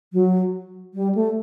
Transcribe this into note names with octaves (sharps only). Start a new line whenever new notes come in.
F#3
G3
A3